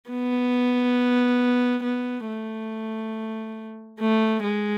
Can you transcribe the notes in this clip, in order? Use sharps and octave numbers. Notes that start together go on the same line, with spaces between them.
B3
B3
A3
A3
G#3